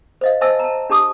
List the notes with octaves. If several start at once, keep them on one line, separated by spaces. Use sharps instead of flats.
C5 D#5 F5
C5 D#5 E5 G#5 A5 E6
A5 A#5
D4 G4 A5 D6 D#6